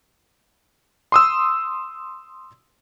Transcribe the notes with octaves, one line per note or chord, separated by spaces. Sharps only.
C6 D#6 E6